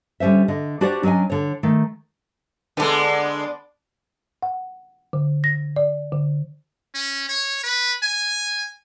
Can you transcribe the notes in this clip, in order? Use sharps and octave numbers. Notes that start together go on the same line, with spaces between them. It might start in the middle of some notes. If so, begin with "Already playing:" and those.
D3 G3 C#4 C5 E5
D3 D#5
D4 F#4 G4 C5 D5 F#5
F#3 C#4 D4 D#5 G#5
D3 C#5
D#3 A3
D3 G#3 B3 D4
F#5
D3
A#6
D5
D3
C#4
C#5
B4
G#5